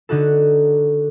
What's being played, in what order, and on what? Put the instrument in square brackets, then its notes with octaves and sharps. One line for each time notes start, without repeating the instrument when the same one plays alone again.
[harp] D3 D#4 F#4 A4